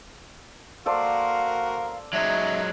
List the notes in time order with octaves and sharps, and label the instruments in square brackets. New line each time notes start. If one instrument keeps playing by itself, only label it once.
[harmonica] A#3 F#4 A#4 [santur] A4 C5 D5 [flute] F5
[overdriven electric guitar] F#3 G#3 [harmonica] C#4 D#4 [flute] E5